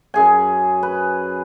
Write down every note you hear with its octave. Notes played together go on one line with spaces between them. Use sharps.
F#2 G#4 G#5
B4